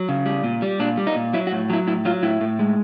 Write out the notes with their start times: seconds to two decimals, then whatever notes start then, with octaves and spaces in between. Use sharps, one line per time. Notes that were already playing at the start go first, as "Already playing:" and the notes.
Already playing: F#3
0.09 C#3
0.26 G3
0.44 A#2
0.62 G3
0.80 A#2 D4
0.97 G3
1.07 D#4
1.16 A#2
1.33 F#3 E4
1.47 F#4
1.51 A2
1.70 F#3 E4
1.87 A2 E4
2.05 F#3 F4
2.23 A2 E4
2.41 A2
2.59 G#3